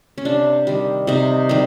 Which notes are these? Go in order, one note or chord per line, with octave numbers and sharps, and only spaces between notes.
C#4
C3 D4
D#3 G3
C3 D#4
D#3 G3